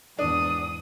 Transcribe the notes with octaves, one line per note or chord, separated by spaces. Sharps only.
E2 G#2 D4 D#6